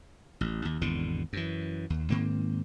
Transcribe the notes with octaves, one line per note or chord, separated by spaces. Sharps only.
A1
D#2
G#1 E2 B2 D3
F#2 E3
D#2
G#2 D#3 A#3 C4